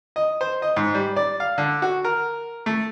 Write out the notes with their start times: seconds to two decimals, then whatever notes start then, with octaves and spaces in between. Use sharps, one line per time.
0.16 D#5
0.41 C5
0.62 D#5
0.76 G#2
0.94 G3
1.16 D5
1.40 F5
1.58 D3
1.82 F#4
2.05 A#4
2.66 A3